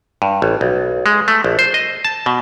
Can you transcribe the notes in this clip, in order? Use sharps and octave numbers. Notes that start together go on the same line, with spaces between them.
G2
A1
B1
G#3
A3
A#1
C5
D#5
A5
B2